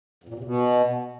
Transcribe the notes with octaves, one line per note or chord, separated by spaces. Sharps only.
F2
A#2
E2
C3
B2